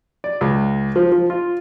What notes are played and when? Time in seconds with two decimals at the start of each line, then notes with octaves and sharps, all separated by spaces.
0.24 D5
0.41 C#2
0.96 F3
1.12 F3
1.30 F4